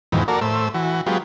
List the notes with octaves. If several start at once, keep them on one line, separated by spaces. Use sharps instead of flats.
F2 G#2 B2 D#3 E3
A#3 F#4 A4 A#4 D5
A2 A3 C5 E6
E3 F#4
F#3 G#3 B3 F4 G4